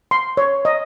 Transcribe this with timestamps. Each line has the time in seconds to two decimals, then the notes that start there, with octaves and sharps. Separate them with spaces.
0.11 C6
0.37 C#5
0.65 D#5